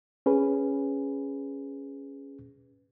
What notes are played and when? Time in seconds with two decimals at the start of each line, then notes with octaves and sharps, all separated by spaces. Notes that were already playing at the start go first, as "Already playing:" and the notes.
0.26 C#4 G#4 B4